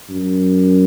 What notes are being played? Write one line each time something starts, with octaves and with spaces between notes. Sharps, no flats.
F#2